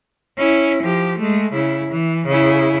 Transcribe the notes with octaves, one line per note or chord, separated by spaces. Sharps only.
C#4 E4
F3 G4
G#3 A3
C#3 E4
E3
C#3 E4